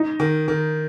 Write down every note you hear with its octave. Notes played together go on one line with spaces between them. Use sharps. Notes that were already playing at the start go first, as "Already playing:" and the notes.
Already playing: D#4
D#3
D#3